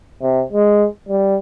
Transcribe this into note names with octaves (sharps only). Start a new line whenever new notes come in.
C3
G#3
G3